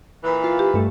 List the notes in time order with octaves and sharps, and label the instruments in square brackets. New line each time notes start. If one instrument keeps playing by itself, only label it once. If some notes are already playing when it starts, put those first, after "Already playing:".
[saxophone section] A#2 E3 B4
[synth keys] F4
[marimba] G4
[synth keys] G2 A3